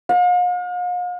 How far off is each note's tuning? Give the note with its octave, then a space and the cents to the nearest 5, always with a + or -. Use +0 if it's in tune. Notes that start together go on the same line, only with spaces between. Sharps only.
F5 +45